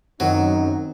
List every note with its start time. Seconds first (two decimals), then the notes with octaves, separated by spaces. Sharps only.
0.20 F#2 D#3 F#3 C4 D#4